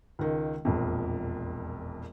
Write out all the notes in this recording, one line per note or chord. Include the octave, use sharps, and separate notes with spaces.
C#2 D#3
E1 A#1 F2